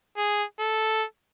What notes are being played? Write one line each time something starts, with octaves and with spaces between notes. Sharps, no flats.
G#4
A4